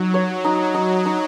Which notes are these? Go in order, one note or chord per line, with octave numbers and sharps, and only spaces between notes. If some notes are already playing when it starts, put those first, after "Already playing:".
Already playing: F#3 D#4
C#5
D#4
D#4
D#4